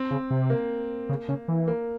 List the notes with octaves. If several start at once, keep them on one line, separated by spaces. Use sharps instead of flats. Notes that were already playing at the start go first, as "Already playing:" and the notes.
Already playing: C4
C#3
C3
A#3
C#3
C#3
E3
A#3